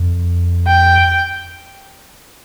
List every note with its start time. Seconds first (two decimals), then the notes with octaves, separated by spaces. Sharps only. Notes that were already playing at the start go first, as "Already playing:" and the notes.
Already playing: F2
0.67 G5